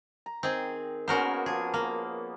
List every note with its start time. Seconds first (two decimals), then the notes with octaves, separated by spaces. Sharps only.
0.26 A#5
0.43 D#3 C4 G#4
1.08 A#3 B3 C#4 F#4 A#4 C5
1.46 F3 G#4
1.74 A#3